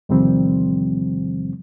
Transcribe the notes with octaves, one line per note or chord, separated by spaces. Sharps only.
E2 C3 D#3 F3 G3 C4